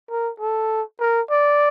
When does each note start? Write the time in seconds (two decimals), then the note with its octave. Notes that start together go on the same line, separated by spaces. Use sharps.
0.10 A#4
0.40 A4
1.00 A#4
1.31 D5